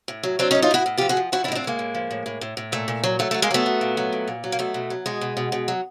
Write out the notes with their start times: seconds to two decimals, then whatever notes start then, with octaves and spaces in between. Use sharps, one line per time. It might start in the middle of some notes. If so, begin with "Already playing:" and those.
0.08 A2
0.23 F#3
0.39 F#3 C4 D4
0.51 C#4 D#4
0.55 A2
0.62 D#4 F4
0.71 A2 E4 F#4
0.86 A2
0.97 F4 G4
1.01 F3
1.09 F#4 G#4
1.17 F3
1.32 F3 E4 F#4
1.44 D4 E4
1.48 A2 D#4
1.55 C4 D4
1.64 A2 G#3 A#3
1.79 A2
1.95 F3
2.11 A2
2.26 A2
2.41 A2
2.57 A2
2.72 A#2 A3
2.88 A#2
3.04 F#3
3.19 F#3 A3
3.31 A3
3.34 F#3
3.42 G#3 A#3
3.51 F#3 A3 B3
3.66 F#3
3.81 A#2
3.97 F#3
4.13 A#2
4.28 A#2
4.44 F#3
4.52 A#3
4.59 B2 A3
4.74 B2
4.90 F#3
5.06 B2 G#3
5.21 B2
5.37 B2
5.52 B2
5.68 F#3